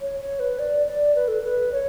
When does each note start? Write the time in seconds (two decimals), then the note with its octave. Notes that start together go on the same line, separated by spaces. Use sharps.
0.01 C#5
0.20 C#5
0.40 B4
0.59 D5
0.87 D5
1.16 B4
1.28 A4
1.42 B4
1.72 C#5